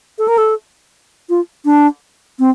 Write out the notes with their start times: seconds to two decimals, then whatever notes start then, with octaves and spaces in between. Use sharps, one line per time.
0.18 A4
0.28 A#4
0.38 A4
1.29 F4
1.65 D4
2.39 C4